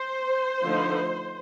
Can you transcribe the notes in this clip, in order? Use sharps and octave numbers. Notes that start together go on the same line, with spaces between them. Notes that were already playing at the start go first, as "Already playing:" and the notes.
Already playing: C5
D3 F3 A3 D#4